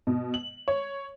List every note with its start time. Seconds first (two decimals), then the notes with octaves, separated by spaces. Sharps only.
0.07 B2
0.34 F#7
0.68 C#5